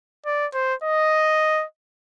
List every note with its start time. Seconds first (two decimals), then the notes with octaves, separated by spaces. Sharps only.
0.26 D5
0.54 C5
0.83 D#5